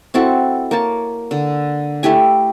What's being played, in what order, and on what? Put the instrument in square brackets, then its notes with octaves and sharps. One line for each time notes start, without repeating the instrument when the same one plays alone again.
[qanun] C4 E4 F#4 A4
A#3 C#5 A5
D3
A3 E4 G4 G#5